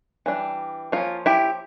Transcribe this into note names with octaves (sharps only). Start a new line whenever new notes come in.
E3 G3 D4
F3 A#3 C#4 F4
E4 G4